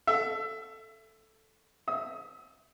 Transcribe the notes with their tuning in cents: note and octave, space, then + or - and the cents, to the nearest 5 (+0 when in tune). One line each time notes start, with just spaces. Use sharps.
A4 +0 E5 +25
E5 +0 D#6 +30